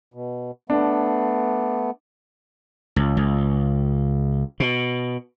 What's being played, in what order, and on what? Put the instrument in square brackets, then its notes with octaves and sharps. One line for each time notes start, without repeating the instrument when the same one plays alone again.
[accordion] B2
[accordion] A3 B3 [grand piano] D4
[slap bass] C#2
C#2
B2